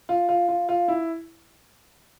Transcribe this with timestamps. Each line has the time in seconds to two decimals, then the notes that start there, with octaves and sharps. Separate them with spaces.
0.09 F4
0.29 F4
0.49 F4
0.69 F4
0.88 E4